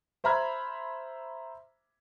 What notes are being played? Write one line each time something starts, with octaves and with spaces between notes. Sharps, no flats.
C5 E5 A#5 B5 F6 G#6